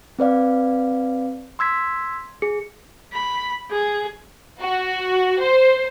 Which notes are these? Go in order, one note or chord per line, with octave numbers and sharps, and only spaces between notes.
C4 B4 D5 F5
C6 E6 G#6 B6
G#4 C#7
B5
G#4
F#4
C5